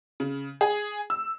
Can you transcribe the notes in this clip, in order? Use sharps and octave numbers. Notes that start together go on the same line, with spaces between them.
C#3
G#4
E6